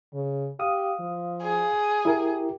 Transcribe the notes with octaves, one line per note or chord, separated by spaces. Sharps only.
C#3
G4 F5 D#6
F3
G#4
E4 G4 A#4